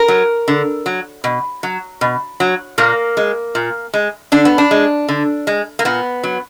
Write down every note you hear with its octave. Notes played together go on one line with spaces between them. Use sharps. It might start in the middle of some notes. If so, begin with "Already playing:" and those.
Already playing: A#4
F#3
D3
F#3
B2
F#3
B2
F#3
A#2 A#3
G#3
A#2
G#3
D3 D4
B3
D4
G#3
D3
G#3
A#3
A#2 B3
F#3